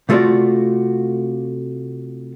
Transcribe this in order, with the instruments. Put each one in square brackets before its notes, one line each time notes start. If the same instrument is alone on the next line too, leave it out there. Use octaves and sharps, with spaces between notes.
[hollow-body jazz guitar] C3 A3 F4 F#4 D5